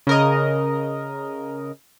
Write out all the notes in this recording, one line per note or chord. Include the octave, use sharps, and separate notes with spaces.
C#3 A#4 D#5